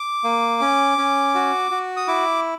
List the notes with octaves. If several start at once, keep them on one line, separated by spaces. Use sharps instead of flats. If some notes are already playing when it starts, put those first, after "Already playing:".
Already playing: D6
A#3
C#4
C#4
F#4
F#4
D#6
E4 D6